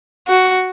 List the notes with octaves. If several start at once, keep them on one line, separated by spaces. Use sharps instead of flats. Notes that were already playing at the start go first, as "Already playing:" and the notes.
F#4